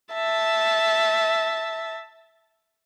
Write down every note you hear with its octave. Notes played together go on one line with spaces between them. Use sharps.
E5 A5